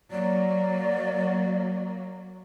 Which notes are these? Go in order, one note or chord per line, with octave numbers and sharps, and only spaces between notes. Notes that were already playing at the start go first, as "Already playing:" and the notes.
F#3 A#3 D5